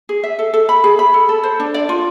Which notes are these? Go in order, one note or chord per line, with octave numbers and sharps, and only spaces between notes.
G#4
E5
A4
A4
B5
G#4
B5
A4
A4
C5
D4
D5
F4